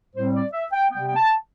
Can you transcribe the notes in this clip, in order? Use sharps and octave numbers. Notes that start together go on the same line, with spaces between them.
A2 G3 C4 C5
D5
E5
G5
C3 G3 B3 G5
G5
A5